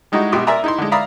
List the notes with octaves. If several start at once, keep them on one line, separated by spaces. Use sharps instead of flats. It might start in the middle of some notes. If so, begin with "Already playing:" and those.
G3 G#3 D#4 E4 F#4
A#1 B2 G4 C6 D6 D#6
A#4 D5 E5 G#5 A#5 C6
D#4 E4 C6
D3 G#3
D5 E5 F5 A#5 B5 D#6